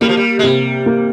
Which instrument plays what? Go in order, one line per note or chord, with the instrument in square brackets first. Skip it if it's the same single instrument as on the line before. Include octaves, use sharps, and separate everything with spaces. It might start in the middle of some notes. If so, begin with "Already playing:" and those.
[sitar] G3 [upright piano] A#3
[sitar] F3
G3
G#3
[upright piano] C3 [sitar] G3
[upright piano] A#3